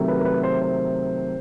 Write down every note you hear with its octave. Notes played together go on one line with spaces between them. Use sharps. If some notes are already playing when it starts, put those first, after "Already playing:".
Already playing: C3 D#3 F#3 A3
B4
A#4
B4
C5
C5